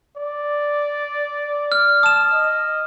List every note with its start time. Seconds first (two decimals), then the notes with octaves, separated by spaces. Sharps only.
0.17 D5
1.72 F6
2.03 A5 D#6 E7
2.32 D#5